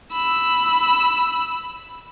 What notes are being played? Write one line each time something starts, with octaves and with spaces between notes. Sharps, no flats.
B5 E6